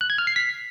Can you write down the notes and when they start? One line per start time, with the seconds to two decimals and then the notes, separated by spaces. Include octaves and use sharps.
0.01 F#6
0.10 G#6
0.18 F6
0.27 C7
0.36 B6